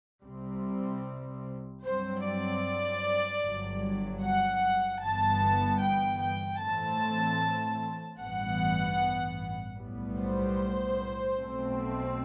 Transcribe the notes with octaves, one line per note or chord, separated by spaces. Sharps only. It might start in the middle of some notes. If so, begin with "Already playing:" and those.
C2 C3 G3 C4
G2 F#3 C4 C5
D5
G1 G2 F#3
F#5
G1 G2 E3 B3 A5
G5
G5
A2 E3 A3 C4 A5
A1 G2 E3 B3 F#5
B1 A2 G3 B3
C5
B1 B2 A3 C4